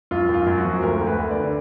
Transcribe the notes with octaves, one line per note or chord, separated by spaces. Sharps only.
F#2 F4
F#2
F4
F#2
F#4
F3
D2 A#4
D2
B4
D2
D5
D3